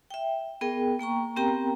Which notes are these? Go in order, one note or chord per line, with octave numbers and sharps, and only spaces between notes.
E5 G5
B3 G#4 A#4 G5
A#3 G5 A#5 C#6
B3 C4 G4 A#4 G5 A#5